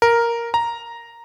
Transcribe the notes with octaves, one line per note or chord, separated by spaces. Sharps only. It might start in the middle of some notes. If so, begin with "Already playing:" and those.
A#4
A#5